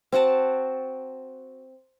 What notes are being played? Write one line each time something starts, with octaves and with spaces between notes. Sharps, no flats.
C4 F#4 F#5 A5